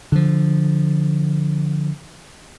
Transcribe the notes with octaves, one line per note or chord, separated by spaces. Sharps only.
D3 F3